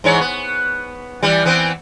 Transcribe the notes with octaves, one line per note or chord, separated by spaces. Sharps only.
G#2 E3 C#5
B3
E3 G3
E3 B3 C4